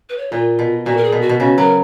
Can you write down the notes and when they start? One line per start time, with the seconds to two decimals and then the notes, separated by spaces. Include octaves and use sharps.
0.09 B4
0.18 C#5
0.32 A#2 F4
0.59 B2
0.85 A#2 F#4
0.97 A#4
1.04 G#4
1.12 B2
1.21 F#4
1.29 B2
1.40 C#3 F#4
1.58 F#3 A#4